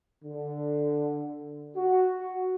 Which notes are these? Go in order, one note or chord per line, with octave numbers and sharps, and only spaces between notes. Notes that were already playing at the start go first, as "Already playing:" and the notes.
D3
F#4